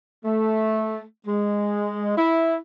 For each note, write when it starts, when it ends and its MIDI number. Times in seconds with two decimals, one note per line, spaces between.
0.25 1.01 57
1.26 2.14 56
2.17 2.56 64